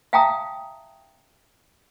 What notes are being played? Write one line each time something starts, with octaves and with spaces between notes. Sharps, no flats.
E5 F5 G5 A5 A#5 D#6